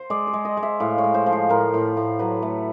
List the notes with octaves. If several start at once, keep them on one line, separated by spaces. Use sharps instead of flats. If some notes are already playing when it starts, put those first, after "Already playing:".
Already playing: C5
G#3 D5
D5
G#3
D#5
G#3
E5
A2 F5
C#5
G#3
C5
F3
C5
A2 A#4
A2
A2
F#3 B4
A3